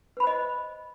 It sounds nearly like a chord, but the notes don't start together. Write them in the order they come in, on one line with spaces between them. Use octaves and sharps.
B4 B5 C5 D#5